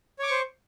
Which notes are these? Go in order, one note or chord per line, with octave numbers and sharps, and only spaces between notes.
C5 C#5 C#6 D6